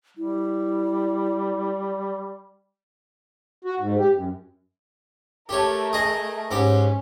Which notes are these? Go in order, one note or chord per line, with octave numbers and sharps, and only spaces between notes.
G3 E4
F#4
G#2
G4
F#2
A3 G4 A#4 C#5
G#4 D#5
G#2 C#4 G4 D6